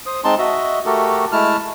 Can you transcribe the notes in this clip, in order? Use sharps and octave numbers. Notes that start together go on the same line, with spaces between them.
C5 D#6
G#3 C4 D#4 A5 C6
F#4 D#5 E5
A3 F#4 G4 A4 A#4
G#3 A3 E4 A5 F6